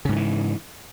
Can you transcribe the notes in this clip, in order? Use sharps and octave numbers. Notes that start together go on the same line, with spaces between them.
G#2 C#3 E3 F3